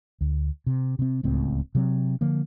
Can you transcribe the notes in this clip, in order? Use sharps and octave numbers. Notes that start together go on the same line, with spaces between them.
D2
C3
C3 C4
D1 C#2 A2 C4
C3 F#3 C4
D3 F3 A#3